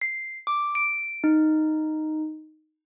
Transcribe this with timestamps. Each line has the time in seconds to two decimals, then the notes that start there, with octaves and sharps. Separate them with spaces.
0.02 C7
0.47 D6
0.75 D7
1.24 D#4